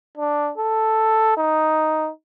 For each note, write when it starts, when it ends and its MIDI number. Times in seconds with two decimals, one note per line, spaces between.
0.17 0.50 62
0.58 1.34 69
1.37 2.09 63